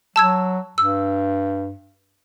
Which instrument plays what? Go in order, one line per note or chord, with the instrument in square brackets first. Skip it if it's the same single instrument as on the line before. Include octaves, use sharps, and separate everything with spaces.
[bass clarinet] F#3 [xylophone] A5 E6 G#6
[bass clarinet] G2 [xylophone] E6